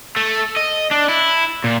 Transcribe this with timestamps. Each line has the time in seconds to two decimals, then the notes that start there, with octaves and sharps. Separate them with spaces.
0.16 A3
0.57 D#5
0.91 D4
1.08 E4
1.64 A#2